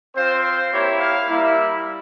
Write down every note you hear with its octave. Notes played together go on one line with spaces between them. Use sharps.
C4 F4 C5
C5
A#3 E4 G4 C#5
F5
G3 A#3 E4